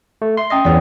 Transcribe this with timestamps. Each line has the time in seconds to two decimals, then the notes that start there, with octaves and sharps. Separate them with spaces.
0.22 A3
0.37 E5 C6
0.50 C#4 D#5 G5 D#6 A#6
0.65 E2 G#4 C#5 D5 F#5